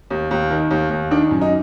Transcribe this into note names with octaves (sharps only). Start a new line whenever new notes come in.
D#2
D#2
D#3
D#2
D#2
D#3 D4
F#2
D#4